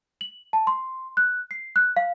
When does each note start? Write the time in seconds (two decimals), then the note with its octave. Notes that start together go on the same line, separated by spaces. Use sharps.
0.21 F#7
0.53 A5
0.67 C6
1.17 F#6
1.51 C7
1.76 F#6
1.97 F5